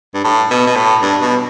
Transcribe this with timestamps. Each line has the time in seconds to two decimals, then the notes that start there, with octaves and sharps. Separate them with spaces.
0.15 G2
0.24 A2
0.51 B2
0.67 B2
0.76 A2
1.02 G2
1.21 B2